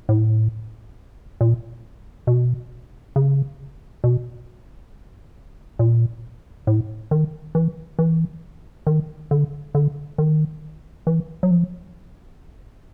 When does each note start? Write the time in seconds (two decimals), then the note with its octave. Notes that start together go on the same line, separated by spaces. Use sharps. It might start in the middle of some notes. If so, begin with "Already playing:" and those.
0.09 A2
1.41 A#2
2.27 B2
3.16 C#3
4.04 B2
5.79 A#2
6.67 A2
7.11 D#3
7.55 E3
7.99 E3
8.87 D#3
9.31 D3
9.75 D3
10.18 D#3
11.07 E3
11.43 F#3
11.51 F3